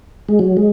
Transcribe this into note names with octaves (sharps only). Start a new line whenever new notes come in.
G#3
F#3
G#3